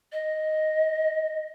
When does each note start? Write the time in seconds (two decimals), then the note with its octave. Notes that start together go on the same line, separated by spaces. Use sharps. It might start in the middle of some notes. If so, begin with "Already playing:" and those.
0.12 D#5